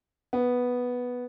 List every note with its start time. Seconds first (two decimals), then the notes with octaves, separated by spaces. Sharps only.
0.33 B3